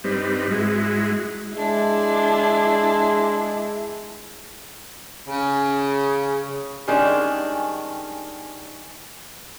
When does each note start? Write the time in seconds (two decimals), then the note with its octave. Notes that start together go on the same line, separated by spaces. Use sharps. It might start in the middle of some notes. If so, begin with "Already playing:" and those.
0.04 G2 G3 C4 D#4 B4
0.51 G#2 G#3 E4 F#4
1.56 G#3 D4 E4
5.26 C#3
6.88 D#3 G3 G#3 C#4 D4